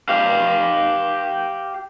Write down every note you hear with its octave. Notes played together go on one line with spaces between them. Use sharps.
G4 F5